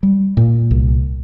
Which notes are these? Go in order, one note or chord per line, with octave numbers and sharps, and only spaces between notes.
G3
A#2
C2